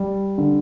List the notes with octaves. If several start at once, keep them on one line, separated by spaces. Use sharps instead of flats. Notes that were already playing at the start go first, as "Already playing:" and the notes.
Already playing: G3
D3